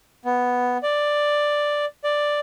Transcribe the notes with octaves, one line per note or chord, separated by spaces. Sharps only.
B3
D5
D5